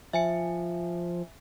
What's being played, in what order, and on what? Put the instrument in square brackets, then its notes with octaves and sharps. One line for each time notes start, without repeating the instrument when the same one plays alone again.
[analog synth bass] F3 [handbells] E5 G#5 C#7